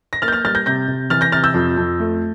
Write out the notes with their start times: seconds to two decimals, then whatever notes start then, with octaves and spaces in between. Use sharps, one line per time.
0.13 A#6
0.22 A#3 F6 A6
0.28 G6
0.32 F6 A6
0.45 G3 F6 A6
0.55 G6 A#6
0.66 C3 G6 A#6
0.88 C3
1.10 E3 F6 A6
1.21 G6 A#6
1.32 C3 F6 A6
1.43 E6 G6
1.54 F2
1.77 F2
2.00 A3